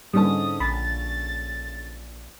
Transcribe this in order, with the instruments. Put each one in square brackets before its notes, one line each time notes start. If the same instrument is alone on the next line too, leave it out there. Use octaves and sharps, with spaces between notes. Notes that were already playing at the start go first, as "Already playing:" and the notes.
[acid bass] G#2 [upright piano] D3 C#4 A5 [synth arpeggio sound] G3 [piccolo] D#6
[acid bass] A#1 [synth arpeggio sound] B5 [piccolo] A6